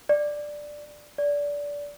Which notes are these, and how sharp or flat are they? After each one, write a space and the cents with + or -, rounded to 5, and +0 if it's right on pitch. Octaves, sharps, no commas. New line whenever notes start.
D5 +5
D5 -20